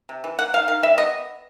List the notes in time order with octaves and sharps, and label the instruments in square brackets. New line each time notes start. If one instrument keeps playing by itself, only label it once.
[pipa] C3
E3
A#3 F#5
D#3 F5
D#3 F5
G3 E5
B3 D#5